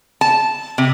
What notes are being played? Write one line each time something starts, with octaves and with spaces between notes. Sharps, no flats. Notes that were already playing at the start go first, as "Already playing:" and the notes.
A5
C3